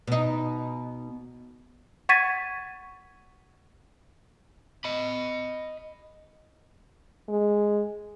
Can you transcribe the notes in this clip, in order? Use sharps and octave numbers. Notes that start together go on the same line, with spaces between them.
B2 D#4
F#5 C#6 G#6 A6 B6 D#7
D#5 B5
G#3